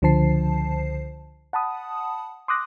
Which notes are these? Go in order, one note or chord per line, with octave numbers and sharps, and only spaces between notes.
C#2 D3 F3 C5 A5 C7
F#5 A5 B5 D#6
C6 D6 D#6 F#6 A#6